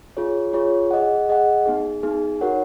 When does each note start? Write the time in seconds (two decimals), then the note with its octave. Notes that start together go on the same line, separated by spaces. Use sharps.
0.17 F4 G#4 C#5
0.53 F4 G#4 C#5
0.91 G#4 D#5 F#5
1.29 G#4 D#5 F#5
1.66 B3 D#4 G#4
2.03 B3 D#4 G#4
2.41 D#4 F#4 A#4 C#5 F#5